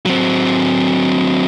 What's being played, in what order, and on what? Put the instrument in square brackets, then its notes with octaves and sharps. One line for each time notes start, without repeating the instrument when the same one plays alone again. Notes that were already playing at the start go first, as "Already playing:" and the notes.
[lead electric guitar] F#3 C4